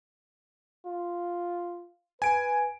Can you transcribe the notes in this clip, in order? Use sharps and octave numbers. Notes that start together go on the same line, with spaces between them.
F4
B4 G#5 D7